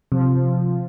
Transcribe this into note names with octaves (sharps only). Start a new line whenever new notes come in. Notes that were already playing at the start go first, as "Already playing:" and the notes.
C3 F3